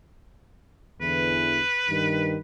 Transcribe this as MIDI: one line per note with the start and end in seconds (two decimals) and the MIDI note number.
1.01 1.61 40
1.01 1.61 50
1.01 1.61 52
1.01 2.39 71
1.89 2.36 43
1.89 2.36 51